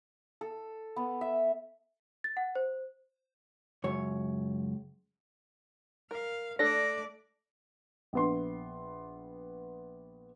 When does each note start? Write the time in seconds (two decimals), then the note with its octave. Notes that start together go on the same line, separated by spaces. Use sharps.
0.41 A4
0.96 B3
1.21 E5
2.24 A6
2.37 F#5
2.55 C5
3.84 C#2 F#2 C#5
6.11 A#4 F5
6.59 A3 D4 A4 D5 A#6
8.13 A#1 B3 C6